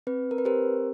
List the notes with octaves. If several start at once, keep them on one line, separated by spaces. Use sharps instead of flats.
C4 B4
A#4
B4
G4 A#4 C5